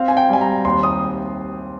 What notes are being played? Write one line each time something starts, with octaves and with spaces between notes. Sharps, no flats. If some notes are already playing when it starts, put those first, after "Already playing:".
Already playing: C4 F5
G#5
G5
G3 G#5
A#5
D#2 C6
D#6